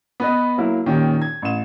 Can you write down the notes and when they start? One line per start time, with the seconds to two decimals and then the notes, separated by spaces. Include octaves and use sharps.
0.20 B3 B4 D#5
0.58 F#3 A#3 E4
0.86 A#2 D#3 C#4 G4
1.22 G#6
1.42 A1 E7